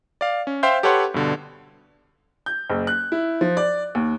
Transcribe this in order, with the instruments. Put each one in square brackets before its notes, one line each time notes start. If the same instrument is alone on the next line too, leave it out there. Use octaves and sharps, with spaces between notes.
[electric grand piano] D5 F5
C#4
C5 E5 F5 G5 C6 G6
G4 A4 B4 C#5 F#5 C6
G2 B2 D3
[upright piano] G6
F#1
F#6
E4
F3
D5
D#2